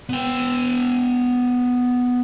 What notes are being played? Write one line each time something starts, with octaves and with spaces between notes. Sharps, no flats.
B3 G5